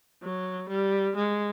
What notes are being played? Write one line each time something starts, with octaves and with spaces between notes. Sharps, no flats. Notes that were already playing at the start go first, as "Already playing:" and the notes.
F#3
G3
G#3